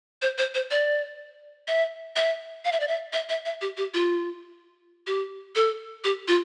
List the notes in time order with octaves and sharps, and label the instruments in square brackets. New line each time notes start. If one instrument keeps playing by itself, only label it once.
[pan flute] C5
C5
C5
D5
E5
E5
F5
E5
D5
E5
E5
E5
E5
G4
G4
F4
G4
A4
G4
F4